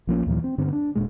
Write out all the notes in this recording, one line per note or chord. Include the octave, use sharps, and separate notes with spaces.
A#1 F3 A#3 C#4
D#2 A#2 E3 F#3
C4
G2 D3 B3 C4
D4
E1 A#2 G#3